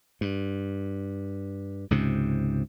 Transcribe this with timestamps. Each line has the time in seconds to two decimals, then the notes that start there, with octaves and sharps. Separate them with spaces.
0.21 G2
1.91 C#2 G#2 C3